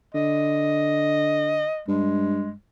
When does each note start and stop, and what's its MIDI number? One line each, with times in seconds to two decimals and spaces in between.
0.15 1.66 50
0.15 1.82 75
1.88 2.51 43
1.88 2.53 56